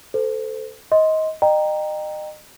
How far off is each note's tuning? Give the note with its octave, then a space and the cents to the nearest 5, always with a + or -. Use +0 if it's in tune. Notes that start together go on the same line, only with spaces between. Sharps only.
A4 +0 C5 -30
D#5 +20 C6 +0
D#5 -35 G5 +0 A#5 +0